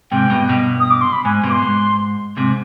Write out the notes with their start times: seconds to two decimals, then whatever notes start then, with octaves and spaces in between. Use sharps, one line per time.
0.11 G#2 C3 G5
0.30 G2 B2
0.49 G2 B2
0.80 D#6
0.91 D6
1.01 C6
1.13 B5
1.24 G#2 G#5
1.43 G2 B2
1.49 D6
1.52 C6
1.62 G#2
2.37 G#2 C3